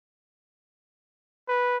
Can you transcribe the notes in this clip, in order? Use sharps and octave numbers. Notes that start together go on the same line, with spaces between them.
B4